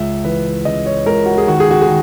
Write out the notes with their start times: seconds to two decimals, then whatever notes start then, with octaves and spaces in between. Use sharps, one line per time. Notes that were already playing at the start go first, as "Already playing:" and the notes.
Already playing: C#2 E5
0.24 E3 B4
0.65 C#3 D#5
0.86 C#5
1.05 C#2 A#4
1.26 F#4
1.38 G#4
1.47 D#3 F#4
1.60 G#4
1.71 F#4
1.81 G#4
1.87 D#3